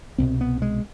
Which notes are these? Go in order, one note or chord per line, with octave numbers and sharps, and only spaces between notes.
C2 B2 C4
B3
G#3